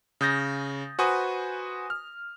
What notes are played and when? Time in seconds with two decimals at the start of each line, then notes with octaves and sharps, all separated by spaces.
0.21 C#3 D#6 G6 A6 A#6
0.99 F#4 B4 C5 G#5 C#6 D#6
1.90 F6